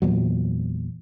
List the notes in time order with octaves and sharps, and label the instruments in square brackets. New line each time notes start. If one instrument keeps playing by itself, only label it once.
[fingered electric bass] E2 A#2 F#3